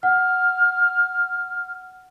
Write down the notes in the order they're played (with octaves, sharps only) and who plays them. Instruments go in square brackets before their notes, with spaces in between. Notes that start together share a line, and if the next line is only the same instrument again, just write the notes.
[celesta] F#5 [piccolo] F6